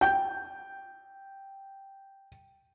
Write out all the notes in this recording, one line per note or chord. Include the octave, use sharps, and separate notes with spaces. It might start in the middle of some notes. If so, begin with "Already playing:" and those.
G5 G6